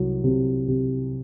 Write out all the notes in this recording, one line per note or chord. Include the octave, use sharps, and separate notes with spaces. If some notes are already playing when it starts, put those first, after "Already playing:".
Already playing: C2 F#3
C3
C3